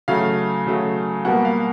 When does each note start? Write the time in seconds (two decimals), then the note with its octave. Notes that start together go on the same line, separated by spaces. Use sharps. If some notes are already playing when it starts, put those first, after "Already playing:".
0.08 C#3 F#3 A3 F5
0.66 C#3 F#3 A3
1.25 B2 G3 A#3 F#5
1.45 F5